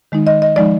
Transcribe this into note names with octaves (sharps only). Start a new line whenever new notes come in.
D#3 G#3 D#4
D#5
D#5
F3 G#3 D#4 D5